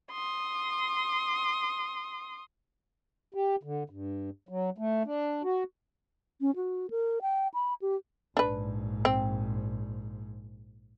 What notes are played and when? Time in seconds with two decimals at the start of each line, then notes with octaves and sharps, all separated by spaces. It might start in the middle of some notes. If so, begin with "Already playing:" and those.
0.12 C6 D#6
3.34 G4
3.63 D3
3.90 G2
4.49 F#3
4.78 A3
5.05 D4
5.44 F#4
6.41 C#4
6.56 F#4
6.90 A#4
7.22 G5
7.54 B5
7.82 G4
8.37 A#1 G#2 D4 B4
9.05 C4